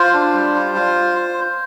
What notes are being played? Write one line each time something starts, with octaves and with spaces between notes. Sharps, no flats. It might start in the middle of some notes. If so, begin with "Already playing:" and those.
Already playing: F4 C5
D4
G3
F4
F4